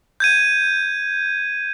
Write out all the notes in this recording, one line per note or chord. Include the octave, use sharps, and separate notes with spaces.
G6 G#6 D#7